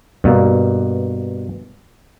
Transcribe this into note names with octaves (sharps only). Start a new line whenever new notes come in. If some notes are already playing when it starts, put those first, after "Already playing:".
G2 B2 A#3